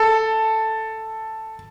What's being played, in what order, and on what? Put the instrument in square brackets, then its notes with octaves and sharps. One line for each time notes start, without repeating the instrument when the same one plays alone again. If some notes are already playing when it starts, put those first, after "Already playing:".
Already playing: [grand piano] A4